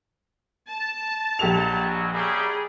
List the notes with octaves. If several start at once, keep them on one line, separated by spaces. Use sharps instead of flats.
A5
A#1 B2 F#3 G4 F7
F#2 C#3 G3 G#4